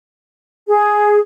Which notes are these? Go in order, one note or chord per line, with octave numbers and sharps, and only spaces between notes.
G#4